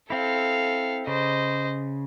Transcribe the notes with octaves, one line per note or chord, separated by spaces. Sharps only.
C4 E4 A4 F5
C#3 C5 D#5